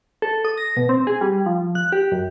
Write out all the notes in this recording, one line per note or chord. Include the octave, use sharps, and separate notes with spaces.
A4
D#6
A#6
B2
C4
G#4
G3
F3
F#6
G4
F#2